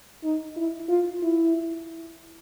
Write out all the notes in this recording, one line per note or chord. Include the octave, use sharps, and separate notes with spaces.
D#4
E4
F4
E4